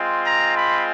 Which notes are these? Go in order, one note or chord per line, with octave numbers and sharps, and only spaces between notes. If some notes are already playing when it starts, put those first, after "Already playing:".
Already playing: G#3 C4 F4
A#5
B5